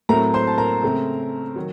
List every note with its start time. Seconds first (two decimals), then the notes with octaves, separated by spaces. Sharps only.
0.09 A2 F#3 A3 C4 A#4 A#5
0.34 C5 C6
0.47 A5
0.58 A#4 A#5
0.83 C#3 A3 C4
1.56 D#3 F#3